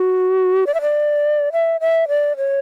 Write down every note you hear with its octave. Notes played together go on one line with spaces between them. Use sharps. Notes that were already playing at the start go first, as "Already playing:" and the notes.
Already playing: F#4
D5
E5
D5
E5
E5
D5
C#5